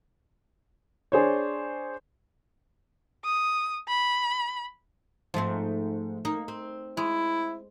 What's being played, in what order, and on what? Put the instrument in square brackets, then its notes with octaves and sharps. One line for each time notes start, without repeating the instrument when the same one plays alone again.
[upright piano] D4 G#4 C5 C#5
[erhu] D#6
B5
[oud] G#2 A3 [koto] F3 C4
[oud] A#3 [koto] D#4
[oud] C4
[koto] G#3 [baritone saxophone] E4